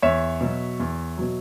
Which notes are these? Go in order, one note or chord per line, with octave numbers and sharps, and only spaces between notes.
E2 C#5 E5
B2 F#3
E2
B2 F#3